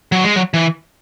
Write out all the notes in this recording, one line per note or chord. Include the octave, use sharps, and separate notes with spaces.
F#3
G#3
F#3
E3